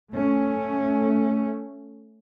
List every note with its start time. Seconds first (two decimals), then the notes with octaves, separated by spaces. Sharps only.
0.12 A3 C#4